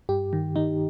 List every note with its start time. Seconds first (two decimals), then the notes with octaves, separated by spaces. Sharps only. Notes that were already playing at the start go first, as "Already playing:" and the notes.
0.09 G2 G4
0.33 D#3
0.56 D#3 D#4